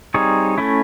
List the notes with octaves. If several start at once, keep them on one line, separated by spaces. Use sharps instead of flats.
G3 C4 D#4 G#4 C#5
A3 C#4 E4